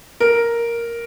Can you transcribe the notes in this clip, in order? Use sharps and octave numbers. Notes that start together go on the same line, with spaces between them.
A#4